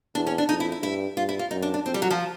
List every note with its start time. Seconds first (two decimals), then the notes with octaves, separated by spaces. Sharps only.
0.15 E2 D4
0.27 C#4
0.38 D4
0.49 F2 D#4
0.60 E4
0.72 E4
0.83 G2 E4
1.17 G2 F4
1.29 E4
1.39 F4
1.51 F#2 D#4
1.62 D4
1.74 D4
1.85 F2 C4
1.94 G3
2.02 F#3
2.11 F3